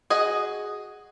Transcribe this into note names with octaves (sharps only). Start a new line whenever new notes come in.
F#4 G#4 D#5